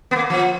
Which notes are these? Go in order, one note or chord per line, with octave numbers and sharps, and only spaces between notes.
B3
A#3
F3